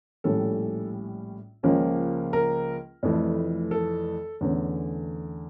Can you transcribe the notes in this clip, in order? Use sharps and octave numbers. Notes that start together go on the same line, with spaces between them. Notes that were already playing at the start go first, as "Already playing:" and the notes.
A#1 A2 G3 C#4 A4
C#2 C#3 F3 A#3 C#4
A#4
F1 F2 E3 A3
A4
E2 D3 A3 C#4